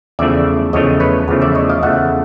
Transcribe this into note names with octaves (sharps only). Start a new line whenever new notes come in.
E2 C#3 F3 A3 D5 E5
E2 C#3 F3 A3 C#5 D#5
B4 C#5
E2 C#3 F3 A3
D5 E5
C#5 D#5
D#5 F5
E2 C#3 F3 A3 E5 F#5